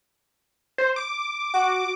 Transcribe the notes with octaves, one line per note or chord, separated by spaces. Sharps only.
C5
D6
F#4 D6